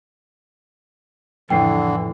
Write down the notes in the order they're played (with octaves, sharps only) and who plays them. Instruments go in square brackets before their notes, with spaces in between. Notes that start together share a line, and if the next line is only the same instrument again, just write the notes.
[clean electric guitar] F2 A2 [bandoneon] D3 E3 [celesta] G5 C7